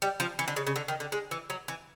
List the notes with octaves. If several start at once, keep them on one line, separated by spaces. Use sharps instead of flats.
G3
F3
E3
D3
C#3
C#3
D3
D#3
D3
G#3
E3
F#3
E3